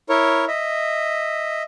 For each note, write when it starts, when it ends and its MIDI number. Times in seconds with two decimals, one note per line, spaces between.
0.09 0.45 64
0.09 0.45 70
0.09 0.45 73
0.48 1.63 75
0.48 1.63 76